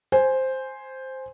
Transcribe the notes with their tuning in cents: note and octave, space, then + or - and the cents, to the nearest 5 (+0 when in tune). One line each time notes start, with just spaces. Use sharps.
C5 +0 G#5 +0